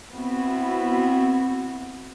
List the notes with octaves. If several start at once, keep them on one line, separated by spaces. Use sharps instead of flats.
B3 C4 E4 F#4